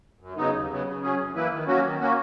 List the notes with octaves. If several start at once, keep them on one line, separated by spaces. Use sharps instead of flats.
F#2
C#3 F#3 B3 D#4
D#2
C#3 F#3 B3
C#3
F#3 C#4 G#4
F#2
E3 A#3 E4 B4
D#3
F#3 A#3 C#4 F#4
D#3
A#3 C#4 F#4